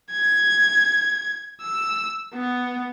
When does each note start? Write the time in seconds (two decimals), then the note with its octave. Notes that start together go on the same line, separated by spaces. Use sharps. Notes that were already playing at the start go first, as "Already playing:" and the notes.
0.11 G#6
1.62 E6
2.34 B3